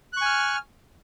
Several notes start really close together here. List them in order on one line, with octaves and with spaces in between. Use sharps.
F#6 C#6 G#5 F6